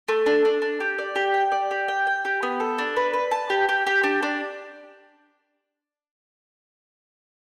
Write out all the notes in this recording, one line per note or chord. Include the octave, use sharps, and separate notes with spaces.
A3
D4
D4
D4
G4
D5
G4
G5
D5
G4
G5
G5
G4
B3
A4
D4
B4
B4
A5
G4
G4
G4
D4
D4